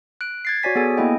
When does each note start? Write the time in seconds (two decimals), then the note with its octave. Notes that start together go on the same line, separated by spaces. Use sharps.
0.21 F#6 D7
0.45 G#6 A6 C7
0.63 F#4 C#5 D5 G#5 B6
0.75 B3 G#4 A4 G#5
0.97 A#3 B3 E4 D#5 G5